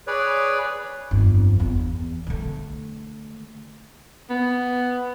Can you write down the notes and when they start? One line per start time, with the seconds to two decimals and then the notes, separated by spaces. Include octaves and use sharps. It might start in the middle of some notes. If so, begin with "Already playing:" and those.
0.07 G#4 B4 C#5 D5
1.11 G1 F2
1.60 E2
2.27 D3 A3
4.30 B3